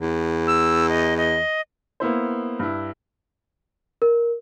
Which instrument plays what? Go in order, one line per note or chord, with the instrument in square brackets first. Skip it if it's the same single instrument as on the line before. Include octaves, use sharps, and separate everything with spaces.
[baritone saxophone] E2
[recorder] E6
D#5
D#5
[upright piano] A#3 B3 E4 C5
G2 E4
[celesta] A#4